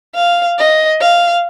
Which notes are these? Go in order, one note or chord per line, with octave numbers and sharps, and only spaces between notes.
F5
D#5
F5